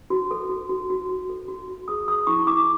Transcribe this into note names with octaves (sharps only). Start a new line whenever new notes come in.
F#4
A4
F#4
F#4
F#4
F#4
A4
F#4
F#4
G#4 D#6
G#4 D#6
E4 C#6
E4 D6